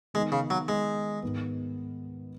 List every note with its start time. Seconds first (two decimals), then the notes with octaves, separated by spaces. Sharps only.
0.14 D#3 G#3 B3 D#4
0.32 C#3
0.50 F#3
0.68 G#3
1.23 G#2 D#3 B3